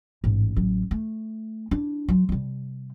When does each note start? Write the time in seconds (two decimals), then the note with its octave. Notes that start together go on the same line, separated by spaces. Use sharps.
0.24 A1 G#2
0.56 A1 F#3
0.91 A3
1.71 D4 E4
2.09 F#3 F4
2.29 C3 G3